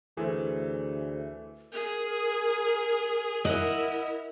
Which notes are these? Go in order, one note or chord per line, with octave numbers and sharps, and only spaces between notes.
D2 E3 A3 G#4 C5
G#4 A#4
E4 A#4 D#5 F#5